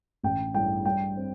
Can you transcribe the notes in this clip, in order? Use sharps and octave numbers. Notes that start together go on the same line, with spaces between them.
A1 G5
G2 E3 G5
G2 G5
C4